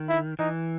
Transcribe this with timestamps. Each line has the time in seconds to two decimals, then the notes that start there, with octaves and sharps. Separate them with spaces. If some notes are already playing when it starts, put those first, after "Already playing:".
Already playing: D#3
0.09 E4
0.39 E3 D#4